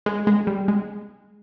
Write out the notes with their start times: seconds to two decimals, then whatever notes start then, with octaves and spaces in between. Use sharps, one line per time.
0.06 G#3
0.27 G#3
0.47 G3
0.68 G#3